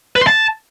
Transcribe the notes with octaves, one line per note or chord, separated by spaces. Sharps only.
B4
C6
A5